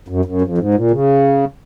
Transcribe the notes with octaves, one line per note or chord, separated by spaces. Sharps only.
F#2
F#2
F2
G#2
A#2
C#3